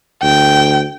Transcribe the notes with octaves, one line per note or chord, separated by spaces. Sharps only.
D2 G5